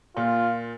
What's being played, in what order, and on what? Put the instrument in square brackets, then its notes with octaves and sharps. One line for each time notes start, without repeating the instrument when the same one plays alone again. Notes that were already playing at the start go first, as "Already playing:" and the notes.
[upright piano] A#2 [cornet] F4